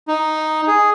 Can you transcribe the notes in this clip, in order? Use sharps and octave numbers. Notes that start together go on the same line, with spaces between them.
D#4
G#4